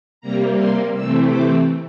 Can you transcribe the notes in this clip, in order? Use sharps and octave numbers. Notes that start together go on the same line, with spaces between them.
C3 G3 A#3 A#5
C6
C3 E3 A3 C4 E6
D6